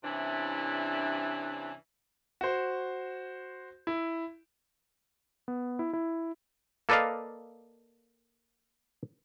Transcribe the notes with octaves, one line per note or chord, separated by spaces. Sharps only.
G2 C3 E3 C#4 D4 E4
F#4 C5
E4
B3
E4
E4
A#3 A4 B4 D5 D#5 F5